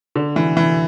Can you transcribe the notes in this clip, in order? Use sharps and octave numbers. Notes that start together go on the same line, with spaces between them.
D3
E3
E3